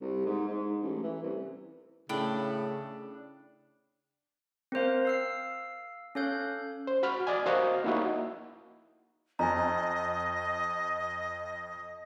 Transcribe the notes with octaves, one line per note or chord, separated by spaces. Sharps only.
C2
G#2
G#2
A1
E3
C2
A2 C#3 D4 G5 B5
C4 A#4 C5 F5
F5 E6 C7
C#4 A4 C#5 F5 F#6 G6
C5
F#4 B5 F6
D5 D#5 G#5
F#4 A#4 C5 D#5 F5 F#5
A#3 D#4 E4 F#4
F2 D#5 G#5 A#5